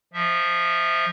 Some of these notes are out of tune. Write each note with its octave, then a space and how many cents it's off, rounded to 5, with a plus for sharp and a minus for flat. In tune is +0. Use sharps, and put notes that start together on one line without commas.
F3 +0 E5 -10